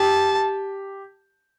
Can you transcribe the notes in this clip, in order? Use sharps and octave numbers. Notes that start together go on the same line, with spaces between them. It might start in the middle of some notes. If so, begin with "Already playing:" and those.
Already playing: G4 A5